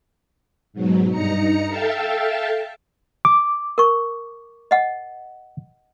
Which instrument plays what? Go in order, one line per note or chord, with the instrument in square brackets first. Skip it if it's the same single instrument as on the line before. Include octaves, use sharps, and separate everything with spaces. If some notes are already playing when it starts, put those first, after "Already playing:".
[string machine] G#2 B2 F#3
G2 D#4 A#5 C#7
A4 E5 F5 G5 A5
[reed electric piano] D6
[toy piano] A#4 C#6
D#5 F#5